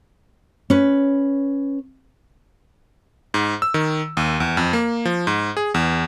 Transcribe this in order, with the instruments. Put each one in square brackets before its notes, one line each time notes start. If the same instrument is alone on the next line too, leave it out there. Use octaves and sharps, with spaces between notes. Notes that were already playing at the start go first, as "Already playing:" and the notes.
[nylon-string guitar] C#4 B4
[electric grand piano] G#2
E6
D#3
D#2
E2
F2
A#3
F3
G#2
G#4
E2